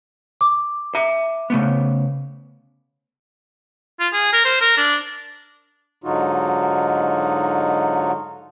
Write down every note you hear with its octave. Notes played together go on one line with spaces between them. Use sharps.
D6
E5 A#5
C#3 A3 B3
F4
G#4
A#4
C5
A#4
D4
G#2 D3 F#3 D#4 F4 F#4